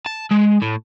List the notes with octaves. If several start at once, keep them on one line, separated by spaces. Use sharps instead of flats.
A5
G#3
A2